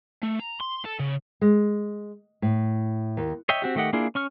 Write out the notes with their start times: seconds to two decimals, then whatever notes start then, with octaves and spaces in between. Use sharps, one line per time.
0.23 A3
0.39 A#5
0.61 C6
0.85 A4
1.00 C#3
1.41 G#3
2.42 A2
3.17 D#2
3.49 C#5 D#5 E5 G5
3.62 C4 F#4 G4
3.75 D#3 A3 G4 D#5 F#5
3.93 A#3 D4 E4 F4 G#4
4.15 C#4 C#6 F6